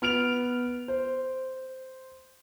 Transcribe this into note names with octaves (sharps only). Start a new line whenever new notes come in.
B3 F6 D7 F7
C5